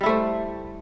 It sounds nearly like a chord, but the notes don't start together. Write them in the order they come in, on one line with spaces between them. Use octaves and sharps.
G3 E4 A3 C5